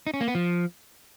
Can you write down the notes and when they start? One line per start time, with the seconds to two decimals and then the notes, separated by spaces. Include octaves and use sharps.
0.07 D#4
0.14 C#4
0.21 A#3
0.28 B3
0.35 F3